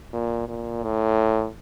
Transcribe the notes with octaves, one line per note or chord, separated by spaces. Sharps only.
A#2
A#2
A2